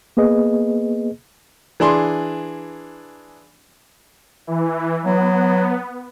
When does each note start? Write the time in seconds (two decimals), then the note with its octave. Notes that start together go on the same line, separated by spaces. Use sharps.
0.17 A#3 B3 G#4 B4 D#5
1.80 E3 D4 G#4 C6
4.47 E3
5.05 F#3 B3